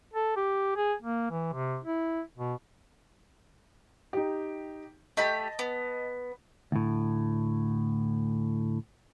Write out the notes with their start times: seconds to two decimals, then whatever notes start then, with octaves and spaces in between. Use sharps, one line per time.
0.14 A4
0.36 G4
0.76 G#4
1.02 A#3
1.31 E3
1.53 C3
1.85 E4
2.37 B2
4.13 D#4 G4
5.17 A3 G4 D#5 A5 B5
5.59 B3
6.72 D2 A2